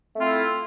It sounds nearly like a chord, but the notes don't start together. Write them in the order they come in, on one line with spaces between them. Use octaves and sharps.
A3 C4 F4 E4